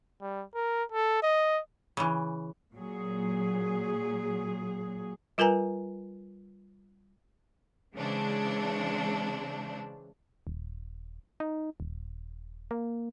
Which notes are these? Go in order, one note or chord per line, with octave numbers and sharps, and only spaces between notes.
G3
A#4
A4
D#5
C#3 E3
A#2 F#3 G#4
G3 F4 A#4 B4 G#5 A#5
C#3 E3 G#3 C4 D4
D#1
D#4
D#1
A#3